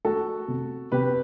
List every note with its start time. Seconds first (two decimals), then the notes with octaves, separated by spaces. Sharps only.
0.05 A3 F#4 A4
0.48 C3
0.92 C3 G4 B4